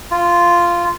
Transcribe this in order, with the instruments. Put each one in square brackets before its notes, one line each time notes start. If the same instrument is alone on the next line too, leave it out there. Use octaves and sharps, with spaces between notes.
[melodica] F4